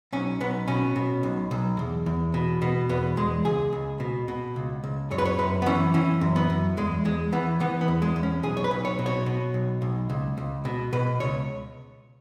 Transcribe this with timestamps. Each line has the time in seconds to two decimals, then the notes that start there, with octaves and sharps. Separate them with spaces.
0.12 B1 C#4
0.40 B1 B3
0.68 B2 C#4
0.96 B2
1.23 B1
1.51 B1
1.79 E2
2.06 E2
2.34 B2
2.62 B2 B3
2.89 E2 B3
3.17 E2 G#3
3.45 C#2 G#4
3.73 C#2
4.00 B2
4.28 B2
4.56 C#2
4.84 C#2
5.11 F#2 C#5
5.18 B4
5.25 C#5
5.39 F#2 B4
5.62 B3
5.66 E3 C#4
5.94 E3 C#4
6.21 F#2
6.36 B3
6.50 F#2
6.77 E2 G#3
7.05 E2 G#3
7.32 E3 B3
7.60 E3 B3
7.81 B3
7.88 E2
8.02 G#3
8.16 E2
8.23 C#4
8.43 B1 G#4
8.57 C#5
8.64 B4
8.71 B1
8.85 C#5
8.99 B2
9.06 C#5
9.26 B2
9.54 B1
9.82 B1
10.10 C#2
10.37 C#2
10.65 B2
10.93 B2 B4
11.20 C#2 C#5